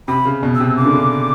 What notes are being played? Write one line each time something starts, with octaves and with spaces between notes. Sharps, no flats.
C3 B5
C#3
B2
E6
C3
C#3 D6
D3
C#3